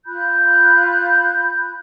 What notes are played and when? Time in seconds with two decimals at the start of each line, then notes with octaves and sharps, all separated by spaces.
0.06 F4 B5 F#6 G6